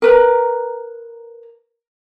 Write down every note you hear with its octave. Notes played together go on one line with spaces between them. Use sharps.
A#4 B4 A#5